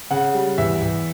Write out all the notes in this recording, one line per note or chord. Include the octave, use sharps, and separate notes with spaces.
C#3 F#5
G3
E2 E5
E2